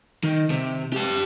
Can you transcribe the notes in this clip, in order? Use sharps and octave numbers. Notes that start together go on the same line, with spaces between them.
D#3
C3
G4 A5